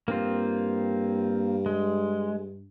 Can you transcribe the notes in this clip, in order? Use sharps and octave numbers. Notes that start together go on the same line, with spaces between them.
G2 A#3 C4 F4
G#3